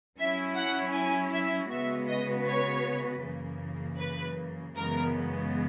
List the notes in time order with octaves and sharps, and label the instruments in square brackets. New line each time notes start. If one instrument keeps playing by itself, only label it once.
[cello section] F#3 C#4 E4 [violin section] E5
[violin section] F#5
G#5
E5
[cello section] C#3 G#3 B3 F#4 B4 [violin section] E5
[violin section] D#5
C#5
[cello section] F#2 C#3 E3 A#3
[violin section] B4
[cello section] F#2 C#3 E3 G#3 B3 [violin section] A#4